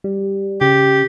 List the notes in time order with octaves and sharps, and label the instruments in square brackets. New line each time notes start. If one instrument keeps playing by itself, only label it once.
[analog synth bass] G3
[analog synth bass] C#3 [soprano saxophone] G4